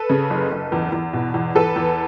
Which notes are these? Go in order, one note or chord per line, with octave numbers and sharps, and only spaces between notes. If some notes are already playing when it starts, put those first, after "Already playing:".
Already playing: A4 B4
C#3
F#1
F#1
E2
E2
B2
E2
E2 A4 B4
E2